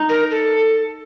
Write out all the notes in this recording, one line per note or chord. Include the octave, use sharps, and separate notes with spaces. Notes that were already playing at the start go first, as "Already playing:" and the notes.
Already playing: D#4
A#4
A4